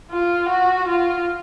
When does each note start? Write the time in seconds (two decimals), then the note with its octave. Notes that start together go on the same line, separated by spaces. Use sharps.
0.11 F4
0.49 F#4
0.88 F4